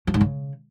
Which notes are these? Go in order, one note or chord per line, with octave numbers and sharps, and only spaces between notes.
F3
G#2
C#3